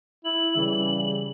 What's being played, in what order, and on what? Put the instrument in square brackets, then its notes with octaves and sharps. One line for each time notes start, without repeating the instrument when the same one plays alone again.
[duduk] E4 [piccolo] F#7
[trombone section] C#3 G3 [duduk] E3